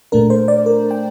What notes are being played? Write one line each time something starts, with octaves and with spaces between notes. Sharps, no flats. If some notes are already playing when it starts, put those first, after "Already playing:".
A#2 A3 D4 A#4
C5
D5
A#4
G5